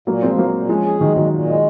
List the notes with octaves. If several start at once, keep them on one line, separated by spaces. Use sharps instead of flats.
A#2 F#3 A#3
F3 G#3 C4
A#2 F#3 A#3
A#2
F3 G#3 C#4
G#4
D#3 F#3 G#3
A#2 D#3 F#3
A#2
G#3